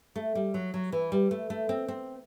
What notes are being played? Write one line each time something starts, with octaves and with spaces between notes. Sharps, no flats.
A3
G3
F#3
F#3
E3
G3
A3
A3
C4
C4